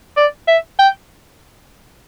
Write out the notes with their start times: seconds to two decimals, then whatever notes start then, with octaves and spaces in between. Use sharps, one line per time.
0.17 D5
0.48 E5
0.79 G5